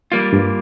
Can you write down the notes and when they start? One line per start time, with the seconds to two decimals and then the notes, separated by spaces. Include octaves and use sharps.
0.12 G3 A#3 F4
0.33 G2